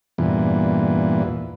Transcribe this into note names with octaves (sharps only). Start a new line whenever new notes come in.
E2 G2 A#2 E3